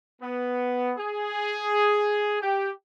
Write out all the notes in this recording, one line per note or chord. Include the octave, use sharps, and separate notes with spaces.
B3
G#4
G4